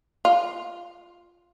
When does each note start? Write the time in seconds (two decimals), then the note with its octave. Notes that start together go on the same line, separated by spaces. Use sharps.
0.25 F4